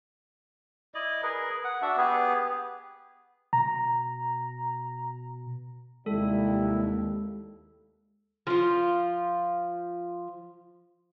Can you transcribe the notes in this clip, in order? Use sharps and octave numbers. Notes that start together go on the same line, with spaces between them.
E4 D5 D#5
G#4 A#4 B4
F#5
D4 F#4 E5
B3 G4 G#4 B4
B2 A#5
D#2 C3 G3 G#3 E4 A4
F3 F4